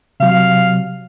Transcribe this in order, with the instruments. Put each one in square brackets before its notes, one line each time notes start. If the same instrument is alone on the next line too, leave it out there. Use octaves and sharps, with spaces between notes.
[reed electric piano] C3 F#3 [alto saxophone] F5